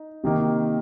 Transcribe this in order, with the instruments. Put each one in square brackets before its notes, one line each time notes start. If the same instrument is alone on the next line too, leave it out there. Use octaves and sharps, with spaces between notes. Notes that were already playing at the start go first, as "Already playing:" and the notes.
Already playing: [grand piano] D#4
C3 D#3 A#3 D#4